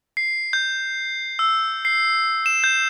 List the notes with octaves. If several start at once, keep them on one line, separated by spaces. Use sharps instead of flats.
C7
G6
E6
C7
E7
G6